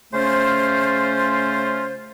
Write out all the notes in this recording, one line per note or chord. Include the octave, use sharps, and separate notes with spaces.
C#3 A3 C#4 F4 C5